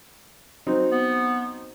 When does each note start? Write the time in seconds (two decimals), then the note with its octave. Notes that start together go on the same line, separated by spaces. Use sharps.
0.67 F#3 C4 D#4
0.91 B3